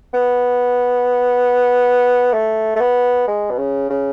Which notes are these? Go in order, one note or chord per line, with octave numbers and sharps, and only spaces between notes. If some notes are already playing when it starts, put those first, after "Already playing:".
B3
A3
A3
B3
G#3
B2
C#3
C#3